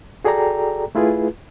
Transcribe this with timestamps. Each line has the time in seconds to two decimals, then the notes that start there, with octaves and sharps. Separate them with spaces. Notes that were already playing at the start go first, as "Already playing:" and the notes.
0.25 F#4 G#4 A4 D5 G5 A#5
0.95 A3 E4 F4 G#4 B4